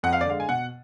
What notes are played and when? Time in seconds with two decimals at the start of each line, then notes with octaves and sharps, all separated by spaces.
0.03 F2 F#5
0.13 F5
0.21 D5
0.26 D3 G#3 F5
0.40 G#5
0.49 B2 F#5